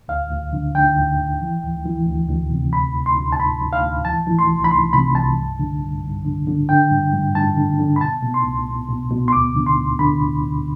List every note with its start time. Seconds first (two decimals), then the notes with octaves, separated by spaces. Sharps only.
0.08 D2 F5
0.30 D2
0.53 D3
0.75 D3 G5
0.96 D2
1.18 D2
1.41 E3
1.63 D2
1.86 E3
2.06 D2
2.29 D2
2.50 C3
2.73 D2 B5
2.95 D2
3.06 C6
3.17 D2
3.32 A5
3.39 D2 B5
3.61 D2
3.73 F5
3.83 D2
4.05 E3 A5
4.27 E3
4.39 C6
4.49 C2
4.64 B5
4.70 C2 C6
4.93 C3 B5
5.15 C2 A5
5.38 G2
5.59 D3
5.82 G2
6.04 G2
6.25 D3
6.47 D3
6.69 D3 G5
6.91 G2
7.13 G2
7.35 G2 A5
7.57 D3
7.79 D3
7.96 B5
8.01 B2 A5
8.23 B2
8.34 C6
8.45 C2
8.67 B2
8.89 B2
9.11 B2
9.28 C6
9.33 D2 D6
9.55 D3
9.67 C6
9.77 D2
9.99 D3 B5
10.22 D2
10.43 D2